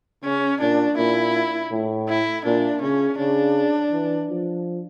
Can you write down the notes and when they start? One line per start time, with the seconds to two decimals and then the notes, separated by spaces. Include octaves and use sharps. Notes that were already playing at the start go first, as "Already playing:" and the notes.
0.24 C#3 C#4
0.61 A#2 D4
0.98 A#2 E4
1.72 A2
2.09 E4
2.45 A#2 D4
2.82 C#3 C#4
3.18 C#3 D4
3.92 E3
4.29 F3